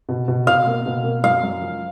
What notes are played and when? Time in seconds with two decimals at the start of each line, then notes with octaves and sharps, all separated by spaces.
0.09 B2
0.28 B2
0.47 B2 F5
0.67 A#3
0.86 B2
1.04 A#3
1.24 F#2 F5
1.43 F#2
1.62 F3